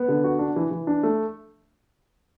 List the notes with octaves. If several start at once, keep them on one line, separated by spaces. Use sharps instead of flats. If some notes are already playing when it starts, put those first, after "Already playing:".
Already playing: B3
D3
F#4
D4
E3
E3
D4
A3